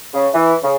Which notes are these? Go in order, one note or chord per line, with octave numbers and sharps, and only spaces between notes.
C#3
E3
C#3